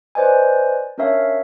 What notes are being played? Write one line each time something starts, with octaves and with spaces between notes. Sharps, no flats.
B4 C5 D5 D#5 G#5
C#4 D4 A#4 C#5 E5 F5